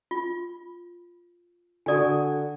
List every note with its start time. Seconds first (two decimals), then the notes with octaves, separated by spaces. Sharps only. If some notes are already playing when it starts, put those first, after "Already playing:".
0.11 F4
1.86 D3 F#4 A4 D5 G#5 D#6